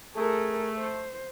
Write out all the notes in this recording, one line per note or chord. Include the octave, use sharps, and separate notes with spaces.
A3 G#4 A#4
C5